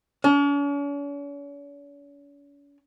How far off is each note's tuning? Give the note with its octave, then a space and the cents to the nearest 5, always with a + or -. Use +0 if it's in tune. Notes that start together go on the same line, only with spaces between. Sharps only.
C#4 +45